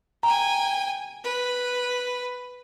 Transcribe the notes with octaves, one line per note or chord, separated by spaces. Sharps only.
G5 G#5 A#5
B4